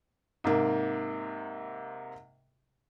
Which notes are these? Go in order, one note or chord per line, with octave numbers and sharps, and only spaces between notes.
G#2 C3 A#3